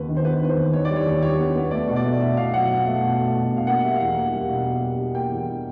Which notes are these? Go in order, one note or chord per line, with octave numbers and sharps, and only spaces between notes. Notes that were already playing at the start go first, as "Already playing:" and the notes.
Already playing: D#2 B3 B4
D#3
C5
B3 B4
D#3 B4
C5
D#2
D#3 C#5
D5
G3
C#5
D#2
G3 C#5
B3
B3
A3 D5
B2
D5
A3
B2 E5
B2 F5
F#3 F#5
B2
A3
B2
A3
B2
B2
F5
A#3 F#5
G3 E5
F5
E2 F#5
A#3
G3
B2
A#3
G3
G3
A#3 G5
E2